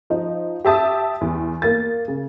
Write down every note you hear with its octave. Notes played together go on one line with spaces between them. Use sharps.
F3 D#4
G4 E5 A5 D#6
E2
A#3 A6
C#3